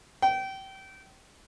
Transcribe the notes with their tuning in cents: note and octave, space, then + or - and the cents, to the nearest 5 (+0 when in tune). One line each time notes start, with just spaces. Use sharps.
G5 -25